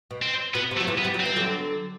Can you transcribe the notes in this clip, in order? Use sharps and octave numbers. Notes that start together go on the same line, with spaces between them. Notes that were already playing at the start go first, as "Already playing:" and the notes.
B2
C4
B2 B3
C3
A3
F#3
C3 E3
B3
G3
F#3
C4
E3
D3 F#3